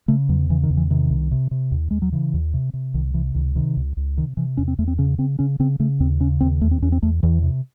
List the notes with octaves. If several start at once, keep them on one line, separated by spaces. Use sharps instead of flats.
C#3 A3
E2 F#3
C#3 E3
D#3
E2
E3
C3 D#3
C2
C3
C3
D#2
D#2 G#3
F#3
C#3 E3
D#2
C3
C3
C2 D#3
C3 E3
C#2 D#3
C3 D#3
C#2
C#2
C3 D#3
C3 E3
E2 C#4
C4
E2 A3
C4
C#3 C#4
C#3 C4
C#3 C#4
C#3 C4
C#3 A3
D#2 C4
C#3 C#4
D#2 C4
E2 A3
C4
E2 C#4
C4
E2 A3
E2 E3
C3